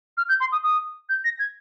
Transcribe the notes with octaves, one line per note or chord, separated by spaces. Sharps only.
F6
G6
C6
D#6
D#6
G6
A#6
G#6